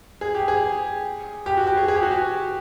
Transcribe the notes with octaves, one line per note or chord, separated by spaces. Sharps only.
G#4
G4
G#4
G4
F#4
G4
G#4
G#4
G4
F#4
G4